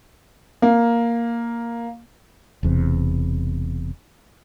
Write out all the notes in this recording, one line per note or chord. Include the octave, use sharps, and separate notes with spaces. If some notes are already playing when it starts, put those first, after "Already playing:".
A#3
E1 E2 C3